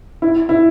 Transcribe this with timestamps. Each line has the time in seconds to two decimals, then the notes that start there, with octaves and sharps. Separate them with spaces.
0.22 E4
0.49 E4